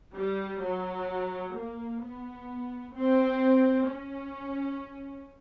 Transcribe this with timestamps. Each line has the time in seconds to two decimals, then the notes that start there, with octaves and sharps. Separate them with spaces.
0.14 G3
0.62 F#3
1.56 A#3
2.02 B3
2.95 C4
3.88 C#4